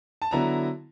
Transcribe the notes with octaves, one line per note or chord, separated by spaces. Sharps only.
A5
D3 F#3 B3 E4 A#5